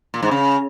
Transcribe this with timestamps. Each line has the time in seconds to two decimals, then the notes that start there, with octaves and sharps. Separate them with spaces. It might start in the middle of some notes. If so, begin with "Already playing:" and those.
0.14 A#2
0.22 G#2
0.31 C#3